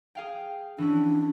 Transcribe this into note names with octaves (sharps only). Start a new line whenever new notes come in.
G#4 F5 G5
E3 C#4 D4 E4